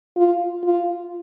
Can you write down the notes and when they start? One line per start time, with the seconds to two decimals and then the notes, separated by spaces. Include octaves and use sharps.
0.17 F4
0.65 F4